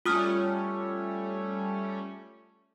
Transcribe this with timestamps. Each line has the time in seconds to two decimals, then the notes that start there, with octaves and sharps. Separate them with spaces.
0.05 G3 A3 C#4 F4 D#6 F6